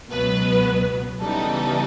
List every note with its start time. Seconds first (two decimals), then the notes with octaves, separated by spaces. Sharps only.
0.10 C#2 B2 F#3 B3 B4
1.20 C#3 E3 G3 B3 D#4 A4